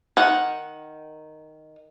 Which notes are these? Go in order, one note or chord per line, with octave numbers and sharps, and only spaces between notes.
D#3 F#5